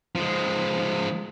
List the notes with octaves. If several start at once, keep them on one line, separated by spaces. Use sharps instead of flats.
F3 G#3